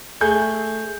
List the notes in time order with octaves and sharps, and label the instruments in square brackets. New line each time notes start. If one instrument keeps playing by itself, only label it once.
[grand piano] A3 G#4 G6